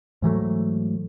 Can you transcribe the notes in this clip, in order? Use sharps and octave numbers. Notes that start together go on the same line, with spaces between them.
G#2 E3 F#3 A3